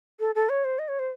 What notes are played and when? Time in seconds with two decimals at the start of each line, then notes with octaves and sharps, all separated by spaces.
0.20 A4
0.35 A4
0.49 C#5
0.64 C5
0.79 D#5
0.88 C#5
0.99 C5